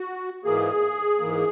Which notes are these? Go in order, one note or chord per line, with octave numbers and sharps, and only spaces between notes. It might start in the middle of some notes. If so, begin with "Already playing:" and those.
Already playing: F#4
G#2 E3 A#3 G#4
G#2 E3 A#3